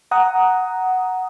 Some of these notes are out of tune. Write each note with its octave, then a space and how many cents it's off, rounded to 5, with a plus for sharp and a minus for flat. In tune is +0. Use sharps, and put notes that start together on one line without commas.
F#5 +5 A#5 +0 D#6 +10